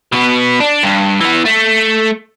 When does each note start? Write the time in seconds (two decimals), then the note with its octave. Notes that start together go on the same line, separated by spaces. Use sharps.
0.12 B2 B3
0.60 D4
0.83 G2
1.21 E3 B3
1.46 A3